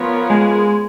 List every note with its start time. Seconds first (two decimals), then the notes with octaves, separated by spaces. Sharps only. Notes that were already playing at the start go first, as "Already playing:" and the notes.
Already playing: F3 B3 F4 A#4 C#5
0.30 G#3